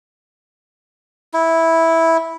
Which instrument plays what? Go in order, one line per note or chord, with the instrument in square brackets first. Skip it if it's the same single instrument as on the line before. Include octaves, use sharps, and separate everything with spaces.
[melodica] E4